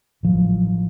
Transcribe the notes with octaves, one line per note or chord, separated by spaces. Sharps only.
A1 F3 F#3